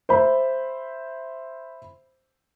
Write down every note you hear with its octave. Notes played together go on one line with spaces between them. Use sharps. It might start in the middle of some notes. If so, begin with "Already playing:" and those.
C5 E5 B5